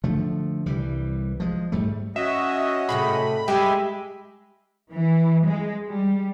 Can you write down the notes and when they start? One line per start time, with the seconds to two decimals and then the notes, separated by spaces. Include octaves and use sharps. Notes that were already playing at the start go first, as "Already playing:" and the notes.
0.04 D3 F3 A3
0.66 C2 E3 G3
1.40 F3 G#3
1.72 G#2 G3 A3
2.16 C#4 F#4 D#5 E5
2.89 A2 C3 G#4 B5
3.48 G#3 G4 E5 G#5
4.92 E3
5.45 G#3
5.88 G3